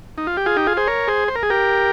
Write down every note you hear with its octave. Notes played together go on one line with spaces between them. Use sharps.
D#4
F4
G4
F4 G#4
D#4 G4
F4 G#4
G#4 C5
A#4 C#5
G#4 C5
C5
A#4
G#4
G4 A#4